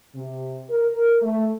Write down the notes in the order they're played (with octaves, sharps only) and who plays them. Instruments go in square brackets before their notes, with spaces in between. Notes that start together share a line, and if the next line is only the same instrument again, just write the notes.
[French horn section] C3
A#4
A3